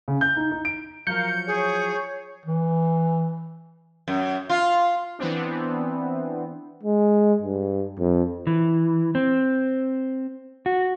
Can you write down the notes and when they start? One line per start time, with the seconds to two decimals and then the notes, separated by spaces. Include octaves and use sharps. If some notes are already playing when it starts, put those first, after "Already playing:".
0.08 C#3
0.21 G6
0.37 D#4
0.51 D#4
0.65 D7
1.07 F3 F#3 A#4 F5 G6 C#7
1.47 G#4 C#5
2.46 E3
4.08 F#2
4.50 F4
5.19 E3 B3 C4 D4
6.83 G#3
7.42 G2
7.99 F2
8.47 E3
9.15 C4
10.66 F#4